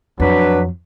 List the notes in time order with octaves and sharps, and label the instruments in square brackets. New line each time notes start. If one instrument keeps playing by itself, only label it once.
[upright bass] F2 [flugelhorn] F#3 [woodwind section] D4 B4